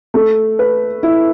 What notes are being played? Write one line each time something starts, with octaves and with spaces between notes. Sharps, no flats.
A3
B4
E4